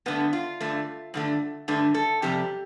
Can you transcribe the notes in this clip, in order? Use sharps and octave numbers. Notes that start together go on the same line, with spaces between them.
G2 D3 A3 B3
F4
G2 D3 A3
G2 D3 A3
G2 D3 A3
A4
F2 C3 G3 G4